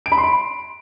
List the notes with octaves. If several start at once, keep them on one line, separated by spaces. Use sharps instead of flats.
D7
B5
C6
B5